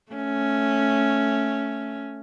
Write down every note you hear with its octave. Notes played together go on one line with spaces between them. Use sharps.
A3 C#4